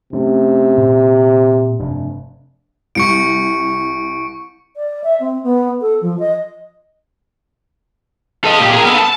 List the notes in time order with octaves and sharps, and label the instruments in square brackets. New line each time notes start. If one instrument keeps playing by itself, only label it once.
[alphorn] C3 [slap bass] A3 C#4
[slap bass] A#2
F1 G2 D4
[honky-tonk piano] C2 [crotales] C#6 C#7 D7
[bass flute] D5
E5
C4
B3
A4
F3
D#5
[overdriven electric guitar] A4 D#5
A#2 G4
G#4 A#4
B3 A4
A5